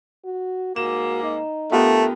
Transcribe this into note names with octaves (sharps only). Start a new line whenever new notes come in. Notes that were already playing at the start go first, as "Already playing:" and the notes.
F#4
G#2 A#3 F#4 E7
D#4
D3 A3 B3 F4 G4 A#4